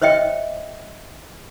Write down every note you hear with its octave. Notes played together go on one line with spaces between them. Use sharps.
C5 C#5 D#5 E5 G5